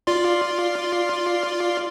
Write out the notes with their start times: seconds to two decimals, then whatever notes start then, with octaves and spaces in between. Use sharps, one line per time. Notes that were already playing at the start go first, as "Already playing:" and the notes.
0.07 F4 D5 C6